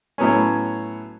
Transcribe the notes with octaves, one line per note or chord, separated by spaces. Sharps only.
A2 F#3 B3 C#4